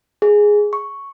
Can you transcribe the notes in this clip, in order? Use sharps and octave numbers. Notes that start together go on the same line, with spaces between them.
G#4
C#6